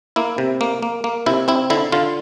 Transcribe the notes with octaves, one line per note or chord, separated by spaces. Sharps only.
A#3 E4
C3
A#3
A#3
A#3
C3 E4
C4 E4
D3 E4
D3 F4